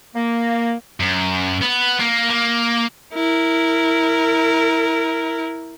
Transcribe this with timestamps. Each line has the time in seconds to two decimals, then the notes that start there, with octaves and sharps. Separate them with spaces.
0.15 A#3
1.00 F#2
1.62 B3
2.00 A#3
2.30 A#3
3.14 E4 A#4